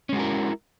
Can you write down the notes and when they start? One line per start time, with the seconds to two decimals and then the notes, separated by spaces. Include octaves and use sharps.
0.09 C#4
0.13 G#3
0.16 F#4
0.19 A#4
0.23 E4